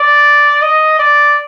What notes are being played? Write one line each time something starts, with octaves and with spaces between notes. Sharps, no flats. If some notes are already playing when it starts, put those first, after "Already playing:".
Already playing: D5
D#5
D5